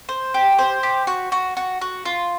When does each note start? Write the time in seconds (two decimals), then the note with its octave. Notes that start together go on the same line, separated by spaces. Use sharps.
0.09 C5
0.34 G4
0.58 C5
0.83 G4
1.07 F#4
1.32 F#4
1.57 F#4
1.81 F#4
2.05 F4